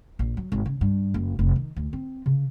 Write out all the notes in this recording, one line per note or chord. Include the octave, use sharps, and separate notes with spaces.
A#1
F#3
G#1
C#3
G2
F#1
F1
D#3
D2
C4
C#3